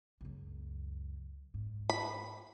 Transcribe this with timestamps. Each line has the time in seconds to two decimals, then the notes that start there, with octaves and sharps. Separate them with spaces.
0.21 C#2 F#2
1.54 G#2
1.90 B5